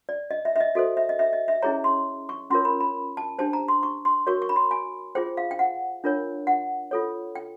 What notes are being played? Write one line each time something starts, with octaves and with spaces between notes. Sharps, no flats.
D5
D#5
E5
E5
D#5
F#4 A4 C5 D#5
E5
D#5
E5
D#5
E5
C#4 E4 G#4 C#5 A#5
C6
C#6
C#4 F4 A#4 C#5 C6
B5
B5
A5
D4 G4 C5 A5
A#5
C6
C#6
C6
F#4 A#4 C#5 C#6
C#6
B5
C6
G#5
F4 G#4 C5 G5
F5
G5
F#5
D4 F4 A#4 C#5
F#5
F4 A4 C#5
G5